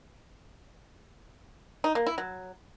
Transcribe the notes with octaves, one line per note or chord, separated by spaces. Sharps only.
D#4
A#3
E4
F#3